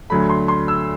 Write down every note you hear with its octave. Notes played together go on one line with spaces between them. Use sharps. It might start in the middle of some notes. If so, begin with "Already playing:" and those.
D2 D3 F#3 A3 B5
C6
C6
E6